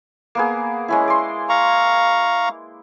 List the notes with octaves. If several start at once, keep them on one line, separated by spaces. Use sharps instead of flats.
A#3 B3 G#4
G#3 C#4 E4
D5 C6
F5 A#5 C#6